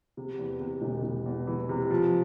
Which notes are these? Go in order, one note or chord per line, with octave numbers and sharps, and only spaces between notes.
C3
E2
C3
E1
E1
E2
E3
C3
F3